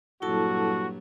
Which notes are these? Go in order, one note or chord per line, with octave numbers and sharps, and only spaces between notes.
G2 A#2 F#3 E4 F#4 A4 A5